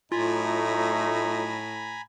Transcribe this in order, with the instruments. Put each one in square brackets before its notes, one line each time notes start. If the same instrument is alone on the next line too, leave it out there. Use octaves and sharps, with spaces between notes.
[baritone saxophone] A2 [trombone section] F#3 A3 D#4 [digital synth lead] F4 [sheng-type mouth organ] G#5 A#5 B5